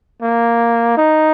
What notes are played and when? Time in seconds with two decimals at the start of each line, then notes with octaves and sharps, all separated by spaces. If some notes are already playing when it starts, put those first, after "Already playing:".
0.22 A#3
0.97 D#4